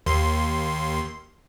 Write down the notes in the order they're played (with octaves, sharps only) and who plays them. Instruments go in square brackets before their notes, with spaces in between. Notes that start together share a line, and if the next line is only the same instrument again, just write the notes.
[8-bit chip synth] D#2 C6